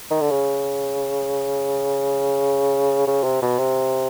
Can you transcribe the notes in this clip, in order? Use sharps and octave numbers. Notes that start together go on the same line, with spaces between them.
D#3
D3
C#3
C#3
C3
B2
C3